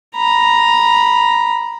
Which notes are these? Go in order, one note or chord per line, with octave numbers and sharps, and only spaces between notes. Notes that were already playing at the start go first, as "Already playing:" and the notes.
A#5 B5